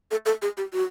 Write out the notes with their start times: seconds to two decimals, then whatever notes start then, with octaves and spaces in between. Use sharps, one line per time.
0.11 A4
0.26 A4
0.42 G#4
0.57 G4
0.73 F#4